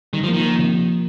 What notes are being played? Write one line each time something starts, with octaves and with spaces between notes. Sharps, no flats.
D#3 G3
F3
A#3
D#3
F3
C3